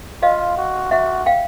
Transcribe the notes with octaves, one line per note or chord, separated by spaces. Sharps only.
F4 D#5 F5
F#4
F#4 E5 F#5
F5 G5